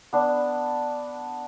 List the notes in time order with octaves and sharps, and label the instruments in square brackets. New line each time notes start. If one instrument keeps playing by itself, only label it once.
[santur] B3 D4